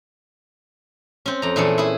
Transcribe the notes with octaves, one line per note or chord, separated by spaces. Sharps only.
C4 C#4
F2 A#5
A#2 E3 A3 G#4 A4
E4 G#4